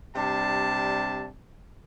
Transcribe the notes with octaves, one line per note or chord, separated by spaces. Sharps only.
C3 G3 D4 A5